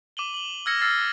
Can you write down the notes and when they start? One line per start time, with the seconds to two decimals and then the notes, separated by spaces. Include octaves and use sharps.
0.17 D6 D#7 F#7 G7
0.34 F#7 G7
0.66 E6 F6 G#6 A#6 C#7
0.81 E6 F6 A6 C7